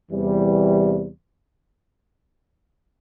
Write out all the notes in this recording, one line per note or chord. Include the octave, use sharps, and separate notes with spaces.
E2 C3 E3 G3